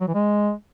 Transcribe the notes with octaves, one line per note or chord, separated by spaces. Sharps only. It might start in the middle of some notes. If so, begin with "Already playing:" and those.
F#3
E3
G#3